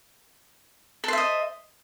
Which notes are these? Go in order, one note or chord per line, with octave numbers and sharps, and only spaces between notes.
A4 C5 D#5 E5